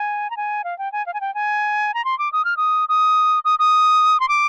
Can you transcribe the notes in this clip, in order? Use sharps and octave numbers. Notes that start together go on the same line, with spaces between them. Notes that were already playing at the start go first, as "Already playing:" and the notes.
Already playing: G#5
A#5
G#5
F5
G5
G#5
F5
G#5
G5
G#5
A#5
C6
D6
D#6
F6
D#6
D#6
D#6
D#6
C6
D6